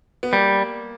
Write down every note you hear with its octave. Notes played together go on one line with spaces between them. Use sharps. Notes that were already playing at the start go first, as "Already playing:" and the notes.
B3
G3 A#3